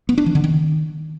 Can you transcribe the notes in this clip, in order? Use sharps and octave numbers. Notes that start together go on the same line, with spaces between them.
B3
D4
E3
D3
D#3